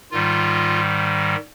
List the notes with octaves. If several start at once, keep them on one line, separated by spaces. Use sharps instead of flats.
G#2 D#3 G3 F4